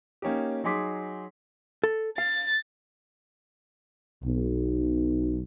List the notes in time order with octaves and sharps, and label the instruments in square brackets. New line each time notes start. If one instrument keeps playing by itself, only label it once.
[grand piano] A#3 C#4 D#4 G4
F#3 D#4 G#4 C6 D6 B6
[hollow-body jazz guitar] A4
[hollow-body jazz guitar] F5 [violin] A6
[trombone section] B1